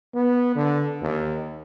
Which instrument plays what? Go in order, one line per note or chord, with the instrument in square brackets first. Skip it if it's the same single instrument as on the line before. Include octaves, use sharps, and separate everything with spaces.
[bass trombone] B3
D3
D#2